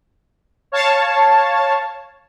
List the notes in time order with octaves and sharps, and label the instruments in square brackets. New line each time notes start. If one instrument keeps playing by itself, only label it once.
[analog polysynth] C#5 F5 A5